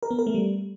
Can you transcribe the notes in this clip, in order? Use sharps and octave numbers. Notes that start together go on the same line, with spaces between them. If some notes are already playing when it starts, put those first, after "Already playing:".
A#4
B3
A#4
A3
G3